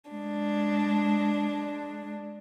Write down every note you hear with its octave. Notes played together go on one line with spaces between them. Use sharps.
G#3 D4